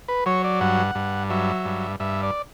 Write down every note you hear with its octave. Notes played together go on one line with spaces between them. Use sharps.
B4
F#3 C#5
D5
G2 F#5
G2
F#3 E5
G2
G2 E5
D5